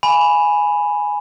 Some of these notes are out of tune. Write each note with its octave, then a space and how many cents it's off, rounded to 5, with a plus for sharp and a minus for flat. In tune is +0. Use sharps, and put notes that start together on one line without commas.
G#5 +0 B5 +0